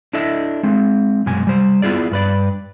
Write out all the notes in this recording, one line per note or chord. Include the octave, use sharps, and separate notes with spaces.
D4 E4 A4 D#5 E5
G#3 C4
F#2 B2 G#3 G#5
G3 C5
B3 E4 F4 G#4 D5
G2 B4 D5